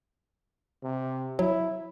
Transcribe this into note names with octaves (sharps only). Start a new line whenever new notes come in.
C3
F#3 E4